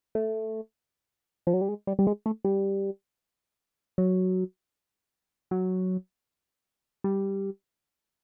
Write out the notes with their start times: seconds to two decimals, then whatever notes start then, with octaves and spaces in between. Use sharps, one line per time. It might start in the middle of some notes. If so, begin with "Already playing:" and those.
0.15 A3
1.47 F3
1.54 F#3
1.61 G3
1.68 G#3
1.87 G3
1.99 G3
2.07 G#3
2.26 A3
2.44 G3
3.98 F#3
5.51 F#3
7.04 G3